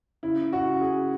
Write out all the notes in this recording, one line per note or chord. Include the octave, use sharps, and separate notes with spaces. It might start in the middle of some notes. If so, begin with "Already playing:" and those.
C#3 E4
F#4
C#3
G#4